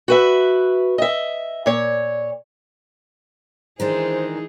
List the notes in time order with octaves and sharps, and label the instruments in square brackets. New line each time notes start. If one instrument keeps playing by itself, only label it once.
[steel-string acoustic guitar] F#4 B4 E5
D#5 E5
A#2 C#5
[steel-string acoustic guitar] D#3 G#3 D4 [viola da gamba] E3 D#4 G#4 [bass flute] C5